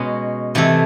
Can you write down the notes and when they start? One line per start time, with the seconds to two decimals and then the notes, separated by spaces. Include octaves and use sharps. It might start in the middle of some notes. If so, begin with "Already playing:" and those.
Already playing: B2 G#3 C#4
0.55 C3 E3 A3